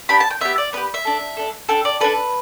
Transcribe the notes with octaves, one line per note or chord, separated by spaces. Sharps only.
B3 D4 G4 B5
A5
G5
B3 G4 E5
D5
B3 G4 B4
E5
D4 A4
D4 A4
D4 A4 G5
D5
D4 A4 B4